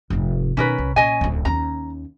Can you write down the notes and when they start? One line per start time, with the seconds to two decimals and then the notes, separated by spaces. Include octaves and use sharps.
0.10 F1 G#2
0.57 B2 D#3 C#4 A#4 B4
0.78 C2
0.96 A#2 C#4 D#5 G#5
1.21 D1 D2
1.45 D#2 C#4 A#5